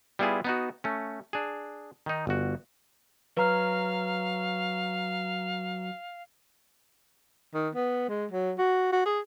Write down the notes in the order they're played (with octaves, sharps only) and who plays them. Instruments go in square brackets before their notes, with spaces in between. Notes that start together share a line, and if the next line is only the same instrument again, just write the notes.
[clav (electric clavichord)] G3 B3 E4 F4 G#4
B3 D#4 F#4
A3 C#4
D4 G#4
D#3 D#4
G1 F#4
[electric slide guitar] F#3 [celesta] B4 A#5 F6 [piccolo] F5
[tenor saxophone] D#3
B3
G#3
F#3
F#4
F#4
G#4